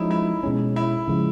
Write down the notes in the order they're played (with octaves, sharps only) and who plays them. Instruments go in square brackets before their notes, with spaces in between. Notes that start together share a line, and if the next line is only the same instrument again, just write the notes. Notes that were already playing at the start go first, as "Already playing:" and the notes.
Already playing: [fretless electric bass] F3 G#3 C#4 [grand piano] D#4 E4
[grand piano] E4
[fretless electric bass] B2 G#3 C#4
[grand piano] E4
[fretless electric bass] C#3 F3 G#3